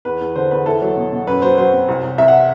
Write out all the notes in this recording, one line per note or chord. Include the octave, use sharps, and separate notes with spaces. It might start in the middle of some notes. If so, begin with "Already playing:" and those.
E2 B4
E2
D3 C5
E2 B4
E4 A4
F#3
B2
B2
F#2 B4
F#3 C5
F#3 C5
C4
C2
C2
C2 E5
F#5